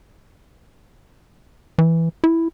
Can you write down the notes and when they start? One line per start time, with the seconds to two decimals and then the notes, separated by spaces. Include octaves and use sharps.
1.78 E3
2.24 E4